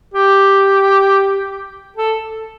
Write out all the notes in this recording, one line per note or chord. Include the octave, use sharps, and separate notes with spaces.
G4
A4